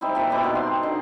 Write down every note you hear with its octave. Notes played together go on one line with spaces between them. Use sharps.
G3 C4 D#4 E4
A#2 E5 A5
B2 C4 E4 D6
D#4 D5 F#5
C6
D3 D#4